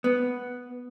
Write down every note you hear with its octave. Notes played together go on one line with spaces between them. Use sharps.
B3